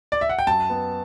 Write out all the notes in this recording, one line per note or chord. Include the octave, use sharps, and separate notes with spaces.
D5
E5
F#5
G5
F#2 A5
B3